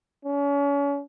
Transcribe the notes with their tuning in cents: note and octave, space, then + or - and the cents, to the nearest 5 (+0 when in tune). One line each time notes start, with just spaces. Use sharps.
C#4 +35